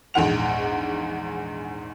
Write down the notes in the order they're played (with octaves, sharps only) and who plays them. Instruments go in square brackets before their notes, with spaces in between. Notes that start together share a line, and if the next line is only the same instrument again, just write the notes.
[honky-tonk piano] A#1 E2 G#2 F#5 F7